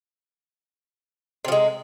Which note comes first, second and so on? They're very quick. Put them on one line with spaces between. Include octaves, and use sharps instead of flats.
C3 F3 G#3